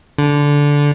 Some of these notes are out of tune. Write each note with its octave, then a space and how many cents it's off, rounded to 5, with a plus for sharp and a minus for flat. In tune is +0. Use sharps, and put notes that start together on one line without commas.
D3 -15